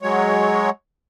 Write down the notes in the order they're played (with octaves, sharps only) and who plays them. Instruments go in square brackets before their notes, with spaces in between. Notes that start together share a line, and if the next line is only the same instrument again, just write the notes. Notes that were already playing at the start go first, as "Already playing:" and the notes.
[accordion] F#3 G#3 C#5